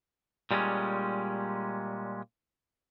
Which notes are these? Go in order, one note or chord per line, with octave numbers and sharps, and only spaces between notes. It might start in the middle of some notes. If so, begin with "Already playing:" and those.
A#2 G3 G#3 C4 C#4